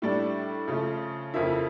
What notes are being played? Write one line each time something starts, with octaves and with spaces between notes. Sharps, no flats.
A2 G3 D4
C#3 F3 A3
F2 C#3 F3 A#3 E4